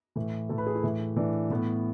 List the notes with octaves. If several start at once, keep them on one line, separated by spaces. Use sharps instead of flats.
A2 E3
A2 E3 A4
B4
G#4
E4
A2 E3
A2 E3 D4
A2 E3 B3